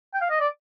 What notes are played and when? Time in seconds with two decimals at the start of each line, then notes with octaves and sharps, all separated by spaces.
0.14 G5
0.21 F5
0.30 D#5
0.40 D5